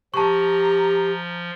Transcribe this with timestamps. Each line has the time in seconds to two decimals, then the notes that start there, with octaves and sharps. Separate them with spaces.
0.14 F3 G4 A5 A#5 C#6